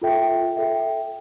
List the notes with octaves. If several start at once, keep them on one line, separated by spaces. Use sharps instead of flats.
F4 A4 E5 G5
A4 E5 G5